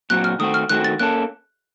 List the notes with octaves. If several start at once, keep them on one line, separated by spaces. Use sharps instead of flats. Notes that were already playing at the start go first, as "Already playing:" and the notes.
A#2 F#3 C4 F#4 F#6
F6
D#3 A3 C4 F#4 D#6
F6
D#3 A3 C4 F#4 F#6
A6
A#3 C#4 A4 F#6